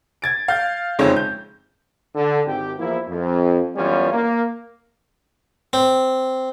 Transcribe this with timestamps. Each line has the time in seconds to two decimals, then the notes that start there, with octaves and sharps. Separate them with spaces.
0.22 G#6 A6 D7
0.48 F5 G6 A6
0.99 F#1 F2 G#3 C4 D#4 C#5
1.16 G6
2.15 D3
2.46 G#1 G4
2.79 E2 F3 A#3 E4
3.08 F2
3.76 F#2 E3 G3 B3 C#4 F4
4.12 A#3
5.73 C4